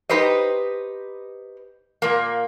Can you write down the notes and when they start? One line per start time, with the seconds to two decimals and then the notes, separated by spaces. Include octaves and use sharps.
0.09 D#4 G4 B4 C5 D#5
2.02 A#2 A#3